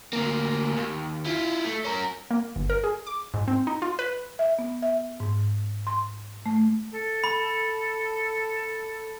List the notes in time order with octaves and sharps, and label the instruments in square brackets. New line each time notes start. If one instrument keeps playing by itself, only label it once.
[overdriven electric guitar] D2 A#3
D#2
E4 F4
A3
C#4 A#4
[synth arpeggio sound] A#3
G1
A#4
G#4
D6
G#2
C4
D#4
F4
B4
[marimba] E5
B3
E5
G#2
C6
A3
[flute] A4
[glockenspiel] B5